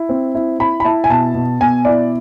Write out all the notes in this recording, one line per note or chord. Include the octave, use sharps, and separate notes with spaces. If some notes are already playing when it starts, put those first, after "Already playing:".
Already playing: E4
C4
E4
E4 B5
B5
E4 A5
G#5
B2 A5
B2
B2 G#5
E4 D5